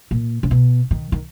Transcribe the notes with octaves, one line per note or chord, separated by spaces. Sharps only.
A#2
C#3
B2
D#3
D#3